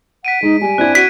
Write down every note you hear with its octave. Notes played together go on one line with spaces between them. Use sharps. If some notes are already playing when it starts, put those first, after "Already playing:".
F#5 B6 D7 D#7
G#3 D#4
G3 G#5
C4 D4 E4 F#6 G#6
F#4 F#6 B6 D7 D#7